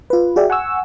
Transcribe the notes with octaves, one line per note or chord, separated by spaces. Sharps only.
F4 B4
F#4 G#4 D5 E5 G5
F#5 G#5 C#6 E6